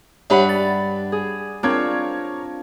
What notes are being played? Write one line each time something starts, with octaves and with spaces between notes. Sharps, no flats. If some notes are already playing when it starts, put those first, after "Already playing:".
G2 D4 G4 C#5 E5 F#5 B5 F#7
A6
G#4
C4 D4 F4 A#4 C#5 G#6